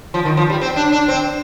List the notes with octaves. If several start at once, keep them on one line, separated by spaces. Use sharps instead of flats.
F3
D#3
F3
G3
C4
D4
D4
C4